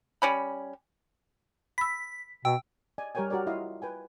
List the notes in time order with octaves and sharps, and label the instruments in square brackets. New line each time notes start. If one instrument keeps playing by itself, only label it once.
[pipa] G3 C#4 B5
[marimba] B5 E6 [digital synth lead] B6
[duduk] B2 [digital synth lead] G5 [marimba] E6
[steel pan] D5 D#5 G#5
G3 G4 A#4 C#5 G5 G#5
F#4 G4 A#4 C#5 D5
E4 F4 D#5 F5
B4 G5 G#5